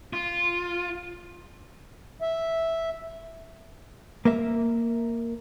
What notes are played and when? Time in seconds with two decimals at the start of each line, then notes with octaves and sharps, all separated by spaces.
0.13 F4
2.22 E5
4.25 A#3 A#4 E5